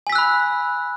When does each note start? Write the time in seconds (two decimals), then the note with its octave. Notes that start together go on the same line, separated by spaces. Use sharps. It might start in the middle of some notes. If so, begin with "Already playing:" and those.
0.07 G#5
0.10 B6
0.12 E6
0.15 F#6
0.18 B5